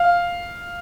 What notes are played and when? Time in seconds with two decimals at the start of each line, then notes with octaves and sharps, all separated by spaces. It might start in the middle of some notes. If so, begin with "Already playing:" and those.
Already playing: F5